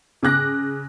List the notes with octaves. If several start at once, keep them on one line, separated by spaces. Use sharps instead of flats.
C#3 D6 F#6 A#6